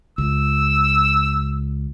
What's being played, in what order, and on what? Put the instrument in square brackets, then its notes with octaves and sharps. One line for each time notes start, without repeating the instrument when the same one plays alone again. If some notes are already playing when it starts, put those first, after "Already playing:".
[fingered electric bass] C#2 [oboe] E6